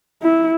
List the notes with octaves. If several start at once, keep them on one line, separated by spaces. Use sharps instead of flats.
E4